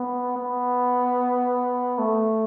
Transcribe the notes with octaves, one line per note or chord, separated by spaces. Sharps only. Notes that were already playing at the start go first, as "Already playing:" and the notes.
Already playing: B3
B3
A3